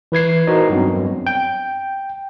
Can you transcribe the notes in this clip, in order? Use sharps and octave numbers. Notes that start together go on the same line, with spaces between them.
E3 B4 G#6 C7
D#4 F#4 A#4 C5 D#5
G2 F#3 B3 C4
G5